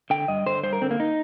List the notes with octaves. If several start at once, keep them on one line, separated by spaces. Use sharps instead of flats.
D3 G5
G2 D#5
D3 C5
G2 C5
A#4
D3 C4
A#3
D#4